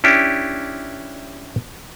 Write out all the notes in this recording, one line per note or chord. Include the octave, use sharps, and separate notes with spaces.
C#4 D4 E4 G4